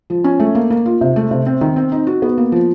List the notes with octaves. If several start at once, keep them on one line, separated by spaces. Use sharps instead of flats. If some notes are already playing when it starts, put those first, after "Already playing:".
F3
C#4
A3
A#3
A#3
F4
C3
A3
C3
C4
D#3
C4
D#4
F#4
B3
A#3
F3